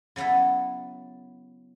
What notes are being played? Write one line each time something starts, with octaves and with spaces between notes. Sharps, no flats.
C#3 F#3 B3 E4 A4